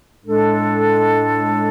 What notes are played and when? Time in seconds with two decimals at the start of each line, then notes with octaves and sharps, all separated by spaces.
0.24 A2 G#3 D4 A4